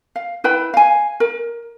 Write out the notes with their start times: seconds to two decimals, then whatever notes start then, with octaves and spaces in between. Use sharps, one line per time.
0.16 F5
0.44 E4 B4 G5 B5
0.74 F5 G#5
1.20 A#4